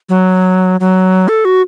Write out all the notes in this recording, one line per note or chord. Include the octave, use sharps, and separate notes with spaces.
F#3
F#3
A4
F#4